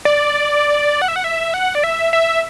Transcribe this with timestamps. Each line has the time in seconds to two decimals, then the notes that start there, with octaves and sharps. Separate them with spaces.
0.05 D5
1.02 F#5
1.08 E5
1.16 F#5
1.24 E5
1.54 F#5
1.75 D5
1.84 E5
2.13 E5